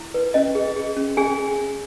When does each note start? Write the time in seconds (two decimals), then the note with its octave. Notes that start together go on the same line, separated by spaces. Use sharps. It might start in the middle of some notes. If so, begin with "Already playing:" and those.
Already playing: E4
0.14 B4
0.34 C#4 D#5
0.55 G#4
0.76 G#4
0.97 C#4
1.17 C#4 G#4 G#5